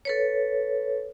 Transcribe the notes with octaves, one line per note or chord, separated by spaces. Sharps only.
A4 B4 C#5